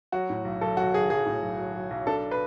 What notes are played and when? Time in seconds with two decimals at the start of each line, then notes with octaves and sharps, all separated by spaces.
0.12 F#3 F#4
0.30 A2
0.45 B1
0.61 B1 A4
0.77 F#3 F#4
0.93 B1 G#4
1.10 B1 G#4
1.26 A2
1.43 B1
1.58 F#3
1.75 F#3
1.91 B1
2.07 D4 A4
2.31 B4